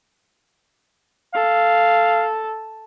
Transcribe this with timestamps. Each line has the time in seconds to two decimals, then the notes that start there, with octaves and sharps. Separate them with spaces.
1.34 A4 F5